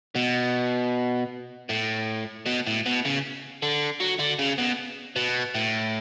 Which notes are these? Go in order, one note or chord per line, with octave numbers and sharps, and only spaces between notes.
B2
A2
B2
A2
B2
C#3
D3
F#3
D3
C#3
B2
B2
A2